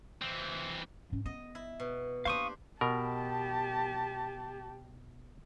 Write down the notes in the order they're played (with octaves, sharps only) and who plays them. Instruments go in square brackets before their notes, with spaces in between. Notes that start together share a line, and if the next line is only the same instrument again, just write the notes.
[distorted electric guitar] E3 C4
[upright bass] G#2 C#4
[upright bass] B3 [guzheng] D#5
[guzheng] E4
B2
[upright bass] A#3 [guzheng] D4 G4 C5 [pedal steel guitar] F5 C#6 D#6
[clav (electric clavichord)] B2 A#4 [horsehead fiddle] G4 A5